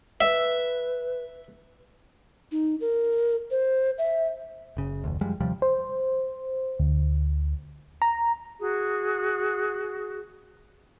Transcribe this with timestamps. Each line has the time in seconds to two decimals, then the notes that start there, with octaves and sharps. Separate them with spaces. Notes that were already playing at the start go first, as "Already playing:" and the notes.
0.21 B4 E5
2.52 D#4
2.81 A#4
3.51 C5
3.98 E5
4.77 F#1 C#3
5.04 F1 D2
5.21 F#2 F3 G3 G#3
5.41 D#2 C3 F3 G3
5.62 C5
6.79 D2
8.02 A#5
8.60 F#4 G#4